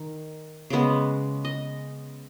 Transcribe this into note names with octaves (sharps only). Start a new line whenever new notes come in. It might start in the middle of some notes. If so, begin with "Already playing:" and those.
Already playing: D#3
C#3 G#3 B3
D#5